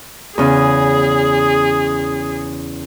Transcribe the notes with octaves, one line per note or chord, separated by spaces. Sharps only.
E2 C#3 G#4